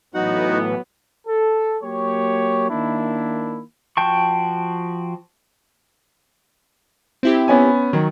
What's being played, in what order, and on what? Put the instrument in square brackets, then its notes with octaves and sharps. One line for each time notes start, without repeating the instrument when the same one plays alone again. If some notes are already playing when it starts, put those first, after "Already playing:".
[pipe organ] A2 E3 [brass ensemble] F#3 B3 [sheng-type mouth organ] D#4 F#4 F#5
[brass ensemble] A4
F#3 A#3 G4 C#5
D#3 A#3 D4 E4
[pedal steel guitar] F3 F#4 G5 A5 C#6
[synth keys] C4 E4 G4
[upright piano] B3 C#4 G#5
[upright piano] D#3 [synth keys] F#3